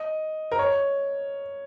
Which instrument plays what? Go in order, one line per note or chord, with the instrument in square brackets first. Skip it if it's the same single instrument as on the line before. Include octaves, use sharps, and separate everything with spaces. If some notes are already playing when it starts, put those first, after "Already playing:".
Already playing: [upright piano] D#5
A#4
C#5